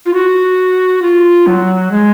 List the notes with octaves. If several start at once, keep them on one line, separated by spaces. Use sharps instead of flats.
F4
F#4
F4
F#3
G#3